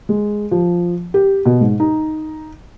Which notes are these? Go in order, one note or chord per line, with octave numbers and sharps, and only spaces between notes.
G#3
F3
G4
B2
G#2
D#4